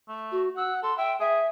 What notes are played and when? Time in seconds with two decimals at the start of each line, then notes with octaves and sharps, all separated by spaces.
0.09 A3
0.31 F#4
0.56 F#5 E6
0.83 A4 C6
0.98 E5 G5
1.20 G#4 E5